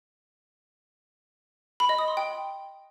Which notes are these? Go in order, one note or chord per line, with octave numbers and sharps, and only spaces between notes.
B5
D#5
D#6
C6
G5